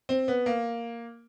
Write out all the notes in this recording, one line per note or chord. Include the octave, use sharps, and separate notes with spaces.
C4
B3
A#3